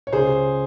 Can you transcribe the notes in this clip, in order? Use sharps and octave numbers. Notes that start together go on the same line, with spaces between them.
C#5
C#2 G#4 C5